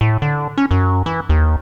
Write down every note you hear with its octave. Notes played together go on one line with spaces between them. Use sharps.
A2
D3
C#4
F#2
E3
D#2